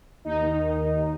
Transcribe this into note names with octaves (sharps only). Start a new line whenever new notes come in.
D#2 D#4
D#3